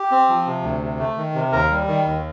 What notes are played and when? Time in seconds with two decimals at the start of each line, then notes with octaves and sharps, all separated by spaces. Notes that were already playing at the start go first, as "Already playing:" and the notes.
Already playing: G4
0.11 C4
0.29 F3
0.46 C3
0.63 D2
0.82 C3
0.99 A3
1.17 D#3
1.35 C3
1.52 D#2 A#4
1.71 G3
1.87 D#3
2.05 D#2